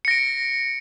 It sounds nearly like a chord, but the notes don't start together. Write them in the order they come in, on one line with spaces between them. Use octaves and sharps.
C#7 A#6 D7